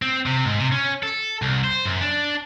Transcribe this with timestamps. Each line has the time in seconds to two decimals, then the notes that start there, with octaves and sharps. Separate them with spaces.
0.02 C4
0.26 C3
0.45 G#2
0.59 C3
0.72 C#4
1.03 A4
1.42 C2
1.64 C5
1.85 F#2
2.01 D4